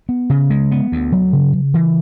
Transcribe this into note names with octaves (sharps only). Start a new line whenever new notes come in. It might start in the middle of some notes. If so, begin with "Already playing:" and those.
B3
C#3
G#3
B3
D2
F#3
C#3
C#3
E3